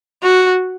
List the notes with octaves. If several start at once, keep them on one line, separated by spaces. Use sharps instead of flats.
F#4